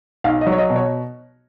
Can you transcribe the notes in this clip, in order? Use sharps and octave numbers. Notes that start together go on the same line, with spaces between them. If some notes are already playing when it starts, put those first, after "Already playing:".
B1 F5
D#5
F#3
C#5
D#5
B2
C#5